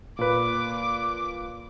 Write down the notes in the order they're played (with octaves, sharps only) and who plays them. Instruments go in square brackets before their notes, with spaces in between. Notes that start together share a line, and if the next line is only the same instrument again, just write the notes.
[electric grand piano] A#2 B4 [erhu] D6